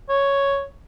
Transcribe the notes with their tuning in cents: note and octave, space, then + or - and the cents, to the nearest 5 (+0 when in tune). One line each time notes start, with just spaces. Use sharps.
C#5 +5